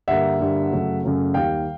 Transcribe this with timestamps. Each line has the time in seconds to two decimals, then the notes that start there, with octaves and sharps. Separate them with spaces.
0.08 G2 D3 G3 A#3 E5 F#5
0.40 G2 D3 G3 A#3
0.71 F#2 C#3 F#3 A3
1.03 F#2 C#3 F#3 A3
1.34 D#2 D#3 G3 F5 G5